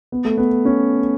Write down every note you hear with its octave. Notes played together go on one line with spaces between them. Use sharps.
B3
A3
B3
C#4